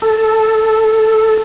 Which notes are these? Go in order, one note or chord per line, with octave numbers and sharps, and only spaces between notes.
A4